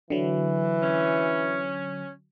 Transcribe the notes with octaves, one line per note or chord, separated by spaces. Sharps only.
D3 E3 F#3
C#4